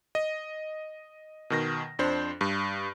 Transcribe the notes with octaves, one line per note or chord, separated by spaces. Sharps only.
D#5
B2 D#3 A#6
F2 D4 C5
G2